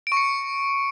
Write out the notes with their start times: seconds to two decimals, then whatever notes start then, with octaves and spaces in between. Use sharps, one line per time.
0.07 D7
0.12 C#6
0.17 C#7